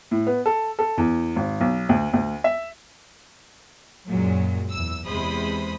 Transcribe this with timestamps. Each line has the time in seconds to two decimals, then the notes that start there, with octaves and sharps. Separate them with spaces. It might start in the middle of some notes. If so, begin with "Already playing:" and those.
0.11 A2
0.27 B3
0.46 A4
0.79 A4
0.98 E2
1.36 G#1
1.61 B1
1.89 D2
2.13 D2
2.44 E5
4.07 F#2 A#2 F#3 G#3
4.72 E2 E6
5.07 E2 C3 G#3 C5 B5 D#6